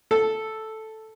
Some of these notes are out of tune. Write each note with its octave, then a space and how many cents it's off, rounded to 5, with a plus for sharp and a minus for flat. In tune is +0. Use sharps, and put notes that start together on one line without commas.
A4 -5